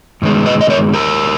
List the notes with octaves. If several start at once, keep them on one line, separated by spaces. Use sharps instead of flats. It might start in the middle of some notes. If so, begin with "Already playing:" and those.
G2 D#3 G#3 B3
B4 D#5
D#5
A#4 C#5
G4 A#4